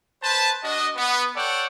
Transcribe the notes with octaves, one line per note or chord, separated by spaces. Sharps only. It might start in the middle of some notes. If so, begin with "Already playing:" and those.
B4 C5 A5
D4 F#4 D#5
B3
A4 C#5 D5 F#5 G5